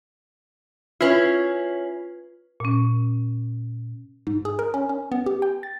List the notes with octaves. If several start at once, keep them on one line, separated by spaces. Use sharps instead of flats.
C#4 E4 F4 B4
A#2 C#4
G#2
G#4
A#4
C#4
C#4
B3
G4
G5
A6